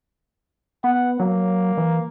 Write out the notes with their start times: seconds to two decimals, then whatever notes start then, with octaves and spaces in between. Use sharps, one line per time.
0.84 B3 F#5
1.20 F#3 A#3
1.77 E3